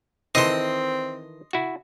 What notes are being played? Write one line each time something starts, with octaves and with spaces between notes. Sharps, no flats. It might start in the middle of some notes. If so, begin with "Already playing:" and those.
D#3 E3 C4 A4 D#5 C6
E4 F#4